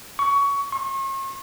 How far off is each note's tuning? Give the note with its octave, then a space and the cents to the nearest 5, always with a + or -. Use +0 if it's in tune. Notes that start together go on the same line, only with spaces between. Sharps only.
C#6 +20
C#6 -45